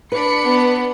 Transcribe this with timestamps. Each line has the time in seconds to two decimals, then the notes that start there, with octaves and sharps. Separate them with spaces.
0.12 D4 B4 B5 C#7
0.44 B3